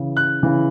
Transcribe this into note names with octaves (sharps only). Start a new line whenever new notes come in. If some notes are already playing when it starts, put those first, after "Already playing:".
Already playing: C#3 E3
F#6
C#3 E3